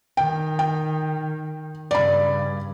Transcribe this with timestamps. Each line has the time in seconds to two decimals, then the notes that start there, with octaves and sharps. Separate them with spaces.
0.17 D#3 G5
0.59 G5
1.91 G2 C#3 D5 B5